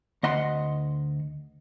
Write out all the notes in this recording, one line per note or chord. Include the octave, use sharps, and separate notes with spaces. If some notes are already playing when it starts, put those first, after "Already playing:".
D2 D#5 F#5 C6